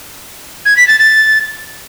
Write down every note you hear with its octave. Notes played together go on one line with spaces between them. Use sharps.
G#6
B6
A6
A6